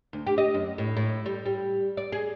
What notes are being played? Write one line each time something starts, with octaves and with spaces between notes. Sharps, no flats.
D2
G4
D#5
F#2
A2
A2
G3
G3
D5
G#4